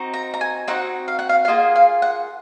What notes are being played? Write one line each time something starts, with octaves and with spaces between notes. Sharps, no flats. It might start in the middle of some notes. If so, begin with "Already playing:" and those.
Already playing: C4 D#4 F#4
A#5
A#5
G#5
C4 D#4 F#4 F#5
F5
F#5
F5
F5
A#3 F4 G#4 D#5
F5
F#5